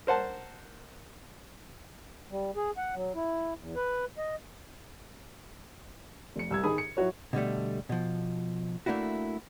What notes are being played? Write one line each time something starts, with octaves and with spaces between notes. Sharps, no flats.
A#4 C5 F#5 A5
G3
G#4
F#5
F#3
E4
E2
B4
D#5
F1 C#7
C2 E6 G#6
D#3 G#4 G#5 B5 D#6
C#7
F#3 E4 F#4 C#5
B2 D3 G3 A3
B2 F3
A3 A#3 D4 E4 F#4